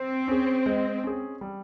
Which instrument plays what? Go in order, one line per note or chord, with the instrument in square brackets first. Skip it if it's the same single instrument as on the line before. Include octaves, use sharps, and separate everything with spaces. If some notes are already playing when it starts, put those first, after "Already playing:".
Already playing: [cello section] C4
[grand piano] C#4 G#4
G#3
C#4 G#4
G3